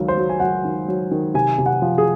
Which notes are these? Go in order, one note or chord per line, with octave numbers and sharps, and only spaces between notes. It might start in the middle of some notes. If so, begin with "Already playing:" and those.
Already playing: C#2 D#3 F#3
C5
F#3
G#5
F#3 F#5
D#3
F#3
D#3
C3 G#5
C3
F#5
F3
G#4